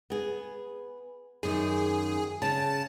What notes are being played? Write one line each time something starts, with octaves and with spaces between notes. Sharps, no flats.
B3 G#4
F#2 D#3 G#4
C#3 A5